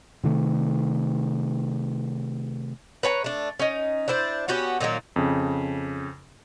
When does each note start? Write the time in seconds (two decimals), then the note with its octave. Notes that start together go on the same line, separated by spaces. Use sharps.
0.24 C3 D#3 A3
3.03 B4 C#5 G#5 A#5
3.24 A3 D4
3.59 C#4 D#4
4.08 D4 E4 C5 D5
4.48 B3 C#4 F#4 G4
4.81 A#2 D#3 F#3 A#3
5.16 F2 C#3